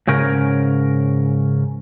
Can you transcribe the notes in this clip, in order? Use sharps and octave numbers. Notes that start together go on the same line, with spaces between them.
G#2 C#3 C#4 A#4